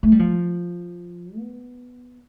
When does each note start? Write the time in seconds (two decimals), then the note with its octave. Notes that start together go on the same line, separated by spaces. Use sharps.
0.03 A3
0.12 G3
0.19 F3
1.38 B3